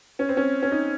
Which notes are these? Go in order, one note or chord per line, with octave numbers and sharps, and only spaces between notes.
C#4
C4
C#4
C#4
D#4